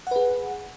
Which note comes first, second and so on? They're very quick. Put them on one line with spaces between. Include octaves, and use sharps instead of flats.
F#5 B4 G#4